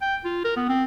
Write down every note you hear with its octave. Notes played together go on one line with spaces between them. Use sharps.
G5
F4
A#4
B3
C4